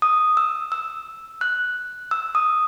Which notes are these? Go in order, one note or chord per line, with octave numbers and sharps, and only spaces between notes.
D#6
E6
E6
F#6
E6
D#6